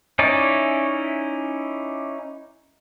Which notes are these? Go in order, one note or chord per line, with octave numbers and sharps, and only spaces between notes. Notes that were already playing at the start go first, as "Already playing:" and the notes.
C#4 D#4 E4 D5